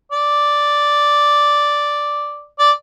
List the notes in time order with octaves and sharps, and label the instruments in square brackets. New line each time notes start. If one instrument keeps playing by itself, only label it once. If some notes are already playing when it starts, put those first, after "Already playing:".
[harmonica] D5
D5